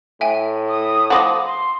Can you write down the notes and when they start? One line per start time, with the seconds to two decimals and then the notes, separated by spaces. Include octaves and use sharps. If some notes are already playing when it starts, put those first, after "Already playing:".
0.21 A2 E5 G5 G#5
0.69 D#6
1.10 F3 F#4 B5 D6 A#6
1.45 C6